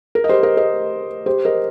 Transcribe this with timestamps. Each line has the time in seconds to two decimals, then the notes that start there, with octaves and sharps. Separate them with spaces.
0.15 A#4
0.24 D#5
0.29 G4 C5
0.43 A#4 D#5
0.57 A#4 D#5
1.26 G4 C5
1.45 A#4 D#5